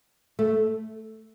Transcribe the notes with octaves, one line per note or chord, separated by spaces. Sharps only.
A3